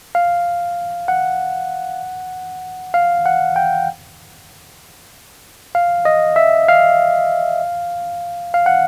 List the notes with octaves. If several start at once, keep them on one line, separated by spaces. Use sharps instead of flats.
F5
F#5
F5
F#5
G5
F5
D#5
E5
F5
F5
F#5